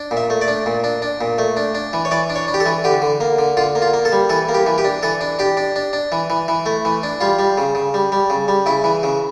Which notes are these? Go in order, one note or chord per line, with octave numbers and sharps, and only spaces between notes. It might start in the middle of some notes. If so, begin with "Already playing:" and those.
Already playing: D4
A#2
E5
A3
D5
D4
A#2
D4
D4
A#2
A3
D4
D4
E3
C#5
E3 D5
D4
C#5
D4
G4
A4
E3
D3 G4
D3
A#3
D3
D3 F4
A#3
F4
A#3
A4
G3
E3 A4
A#3
G4
E3
G4
D4
E3 A4
D4
D4 G4
D4
D4
D4
E3
E3
E3
A3
E3
D4
G3 F4
G3
C#3
C#3
G3
G3
C#3
G3
C#3 E4
E3
C#3